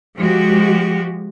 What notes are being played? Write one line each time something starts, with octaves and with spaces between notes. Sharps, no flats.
F3 G#3 F#4 G4